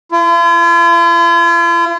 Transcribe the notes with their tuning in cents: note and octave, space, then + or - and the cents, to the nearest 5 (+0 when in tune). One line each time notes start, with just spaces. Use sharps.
F4 -45